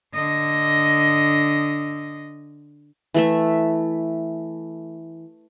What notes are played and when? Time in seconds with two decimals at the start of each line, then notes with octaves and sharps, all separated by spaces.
0.14 D3 D#5
3.14 E3 A3 E5